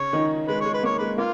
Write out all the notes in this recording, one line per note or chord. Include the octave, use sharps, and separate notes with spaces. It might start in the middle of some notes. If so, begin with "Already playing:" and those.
Already playing: C#3 C#4 C#5
D#3 D#4
G#3 B4
G#3 C#5
B4
A#3 C#5
G#3 B4
A#3 F4